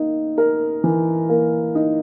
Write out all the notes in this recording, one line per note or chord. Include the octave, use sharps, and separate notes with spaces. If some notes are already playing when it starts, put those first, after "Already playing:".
Already playing: A#3 D#4
A#4
E3
A#3
D#4